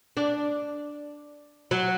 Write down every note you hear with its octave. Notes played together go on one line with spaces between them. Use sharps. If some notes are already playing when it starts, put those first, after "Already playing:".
D4
F#3